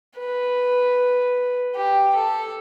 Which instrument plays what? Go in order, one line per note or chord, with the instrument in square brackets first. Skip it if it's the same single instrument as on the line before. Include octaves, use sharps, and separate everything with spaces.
[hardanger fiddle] B4
G4
A4